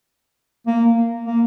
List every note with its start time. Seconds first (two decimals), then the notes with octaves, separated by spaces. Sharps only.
0.67 A#3
1.24 A#3